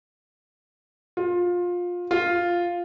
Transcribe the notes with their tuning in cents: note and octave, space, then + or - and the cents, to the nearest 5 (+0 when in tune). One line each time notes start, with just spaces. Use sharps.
F4 +20
F4 +0